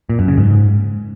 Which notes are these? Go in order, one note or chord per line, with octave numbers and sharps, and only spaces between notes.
A#2
F#2
C#3
G#2